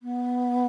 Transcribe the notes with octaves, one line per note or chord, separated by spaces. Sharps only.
B3